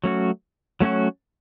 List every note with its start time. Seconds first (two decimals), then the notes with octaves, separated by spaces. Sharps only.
0.04 F#3 A3 C#4 F#4
0.81 F#3 A3 C#4 F#4